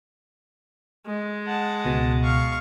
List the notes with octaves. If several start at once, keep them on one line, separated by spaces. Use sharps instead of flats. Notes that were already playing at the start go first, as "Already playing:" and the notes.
G#3
F#5 A5
C#2 B2
F5 C#6